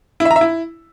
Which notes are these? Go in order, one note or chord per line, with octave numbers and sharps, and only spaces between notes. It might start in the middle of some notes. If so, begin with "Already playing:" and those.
E4
E5
A#5
E5
E4